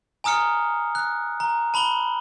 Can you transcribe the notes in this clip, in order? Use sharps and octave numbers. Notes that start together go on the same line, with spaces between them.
G#5 A#5 D#6 F6 C#7
F#6
A#5
A5 B5 F#7 G7